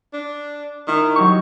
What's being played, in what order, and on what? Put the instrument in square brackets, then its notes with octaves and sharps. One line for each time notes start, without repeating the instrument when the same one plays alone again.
[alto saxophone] D4
[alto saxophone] D#3 [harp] E4
[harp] F#3 D#4 G4 [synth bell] C#6